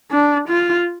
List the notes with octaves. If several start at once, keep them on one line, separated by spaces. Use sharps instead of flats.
D4
F4